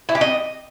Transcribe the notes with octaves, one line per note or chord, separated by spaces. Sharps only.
E4
G4
D#5